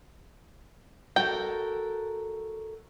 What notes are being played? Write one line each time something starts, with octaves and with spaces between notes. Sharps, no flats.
F#4 A4 A#4 G5